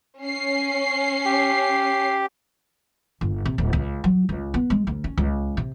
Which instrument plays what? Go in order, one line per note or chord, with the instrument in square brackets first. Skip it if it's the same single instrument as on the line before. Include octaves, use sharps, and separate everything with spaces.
[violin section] C#4 C7
[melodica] G4
[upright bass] G1
C3
D1
C#2
F#3
C#2
B3
G#3
D2
C#4
C#2
C3